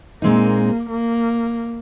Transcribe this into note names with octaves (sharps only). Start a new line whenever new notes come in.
A#2 G#3 A#3 C4 D#4
A#3